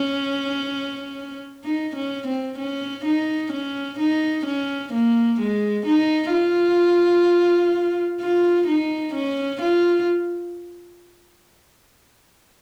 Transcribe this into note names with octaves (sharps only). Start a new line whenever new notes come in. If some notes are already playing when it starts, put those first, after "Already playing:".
Already playing: C#4
D#4
C#4
C4
C#4
D#4
C#4
D#4
C#4
A#3
G#3
D#4
F4
F4
D#4
C#4
F4